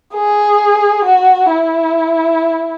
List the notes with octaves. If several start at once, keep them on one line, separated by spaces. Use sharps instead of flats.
G#4
F#4
E4